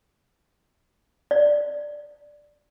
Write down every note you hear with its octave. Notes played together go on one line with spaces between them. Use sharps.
D5